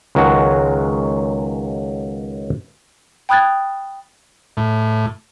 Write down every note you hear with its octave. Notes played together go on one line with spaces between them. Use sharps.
C#2 D#3 F#3 G#3 F#4 C5
G5 B5 D#6 F#6 G#6 A6
A2